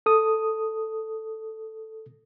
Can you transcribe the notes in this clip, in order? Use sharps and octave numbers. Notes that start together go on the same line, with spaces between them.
A4 D#6